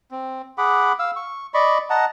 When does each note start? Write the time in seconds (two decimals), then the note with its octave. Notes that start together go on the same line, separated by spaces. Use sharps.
0.11 C4
0.58 G#4 F#5 B5 D6
0.99 F5 E6
1.16 C#6
1.54 D5 D#5 B5 C#6
1.90 D#5 F#5 A5 A#5